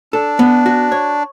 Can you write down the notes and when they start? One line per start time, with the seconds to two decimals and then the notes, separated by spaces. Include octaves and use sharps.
0.13 D4 A4
0.39 B3
0.66 F#4
0.92 C#5